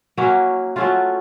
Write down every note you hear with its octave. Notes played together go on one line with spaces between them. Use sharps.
F#3 A#3 C#4 E4
F#3 A3 C#4 F4